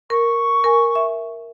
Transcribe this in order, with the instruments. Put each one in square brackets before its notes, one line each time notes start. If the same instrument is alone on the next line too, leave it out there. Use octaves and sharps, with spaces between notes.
[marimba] A#4 [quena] C#6
[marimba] A#4 G#5
E5